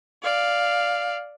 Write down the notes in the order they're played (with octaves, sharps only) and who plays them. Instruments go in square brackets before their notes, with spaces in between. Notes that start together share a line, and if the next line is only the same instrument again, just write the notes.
[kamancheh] D5 F5